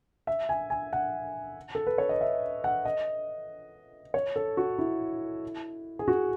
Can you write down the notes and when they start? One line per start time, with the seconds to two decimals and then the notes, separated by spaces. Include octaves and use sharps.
0.27 E5
0.49 G#5
0.70 G#5
0.93 F#5
1.75 A4
1.87 B4
1.98 C#5
2.09 D#5
2.21 E5
2.64 F#5
2.85 D#5
4.14 C#5
4.36 A4
4.57 F#4
4.78 E4
5.99 G#4
6.08 F#4